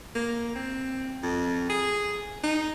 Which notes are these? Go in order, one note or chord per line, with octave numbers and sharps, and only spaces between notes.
A#3
C4
F2
G#4
D#4